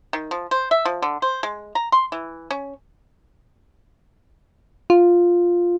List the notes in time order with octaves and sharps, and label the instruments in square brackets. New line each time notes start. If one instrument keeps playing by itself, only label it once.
[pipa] D#3
F3
C5
E5
F3
D3
C5
G#3
A#5
C6
E3
C#4
[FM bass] F4